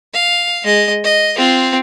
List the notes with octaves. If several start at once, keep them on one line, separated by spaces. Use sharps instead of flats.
F5
G#3 D#5
D#5
C4 F4